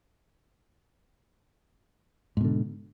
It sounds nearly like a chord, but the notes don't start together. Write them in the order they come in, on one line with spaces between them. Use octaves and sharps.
G#2 B2 D3